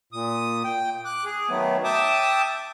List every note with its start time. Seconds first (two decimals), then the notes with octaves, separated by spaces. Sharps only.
0.13 A#2 D#6
0.64 G5
1.05 D6 F#6
1.25 G#4
1.49 D#3 F#3 A3 B3
1.84 E5 G5 A5 D6 D#6